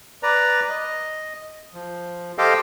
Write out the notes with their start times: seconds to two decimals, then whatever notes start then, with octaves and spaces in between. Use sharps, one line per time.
0.23 B4 D5 A#5
0.70 D#5
1.74 F3
2.38 G4 A4 C5 D#5 F5 G5